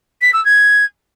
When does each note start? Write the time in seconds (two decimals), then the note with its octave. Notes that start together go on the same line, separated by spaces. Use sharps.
0.21 B6
0.33 E6
0.44 G#6